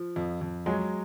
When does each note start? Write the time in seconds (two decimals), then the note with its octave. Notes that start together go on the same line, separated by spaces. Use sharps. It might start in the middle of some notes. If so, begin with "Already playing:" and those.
Already playing: F3
0.16 F2
0.41 F2
0.66 F#3 G#3